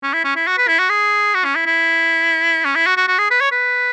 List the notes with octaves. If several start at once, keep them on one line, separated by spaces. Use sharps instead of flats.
C#4
E4
C#4
E4
F#4
B4
E4
F#4
G#4
F#4
C#4
E4
E4
C#4
E4
F#4
F#4
F#4
G#4
B4
C#5
B4